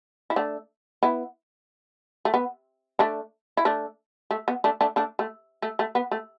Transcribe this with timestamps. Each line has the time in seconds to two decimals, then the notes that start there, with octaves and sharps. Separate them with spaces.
0.30 E4
0.36 A3 D4
1.03 B3 E4
2.25 A3
2.34 B3
2.99 A3 D4
3.57 E4
3.65 A3 D4
4.31 A3
4.48 B3
4.64 A3 D4
4.81 A3 D4
4.96 A3 D4
5.19 A3
5.62 A3
5.79 A3
5.95 B3
6.11 A3